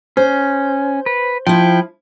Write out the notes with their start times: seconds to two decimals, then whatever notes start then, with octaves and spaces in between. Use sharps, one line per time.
0.17 C#4 C5
1.06 B4
1.47 F3 E4 G5